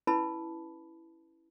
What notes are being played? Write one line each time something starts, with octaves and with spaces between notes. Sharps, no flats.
C#4 E4 B4 A5 B5